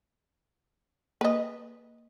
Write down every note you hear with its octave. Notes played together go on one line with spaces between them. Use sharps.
A#3 B4 D#5